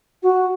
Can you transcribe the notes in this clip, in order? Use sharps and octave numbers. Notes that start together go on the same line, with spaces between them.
F#4